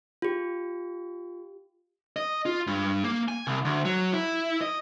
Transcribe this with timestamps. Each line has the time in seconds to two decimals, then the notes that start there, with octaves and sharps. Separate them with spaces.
0.22 F4 G4
2.16 D#5
2.46 F4
2.67 G2
3.04 A#3
3.28 G#5
3.47 C2
3.64 D2
3.85 F#3
4.13 E4
4.61 D#5